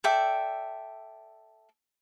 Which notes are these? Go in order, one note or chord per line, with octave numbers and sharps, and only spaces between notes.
A4 D5 E5 G5